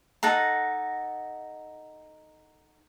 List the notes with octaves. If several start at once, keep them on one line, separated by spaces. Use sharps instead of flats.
D#4 A4 F#5 A#5